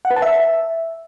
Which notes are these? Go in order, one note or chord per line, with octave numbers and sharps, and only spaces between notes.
F#5
B4
A5
E5